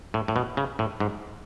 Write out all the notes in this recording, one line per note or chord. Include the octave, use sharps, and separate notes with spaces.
A2
A2
B2
C#3
A2
G#2